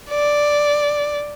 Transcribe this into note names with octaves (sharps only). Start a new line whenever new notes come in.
D5